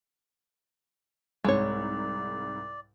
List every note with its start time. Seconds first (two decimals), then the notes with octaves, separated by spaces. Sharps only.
1.44 C2 G#2 G#3 C#5 D5